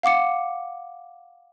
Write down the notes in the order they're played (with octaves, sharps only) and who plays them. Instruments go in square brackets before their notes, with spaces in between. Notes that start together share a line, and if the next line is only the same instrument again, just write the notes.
[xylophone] F5 F#5 D6 C#7